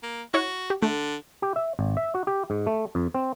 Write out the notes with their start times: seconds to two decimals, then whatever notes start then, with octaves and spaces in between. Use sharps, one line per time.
0.03 A#3
0.34 E4 F#4 C#5 F#5
0.70 G4
0.82 D3 A3
1.42 G4
1.56 E5
1.79 G#1
1.97 E5
2.14 F#4
2.27 G4
2.50 G#2
2.67 A3
2.95 F2
3.15 C4